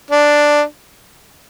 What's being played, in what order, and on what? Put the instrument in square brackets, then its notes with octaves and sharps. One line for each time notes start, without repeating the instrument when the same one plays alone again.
[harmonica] D4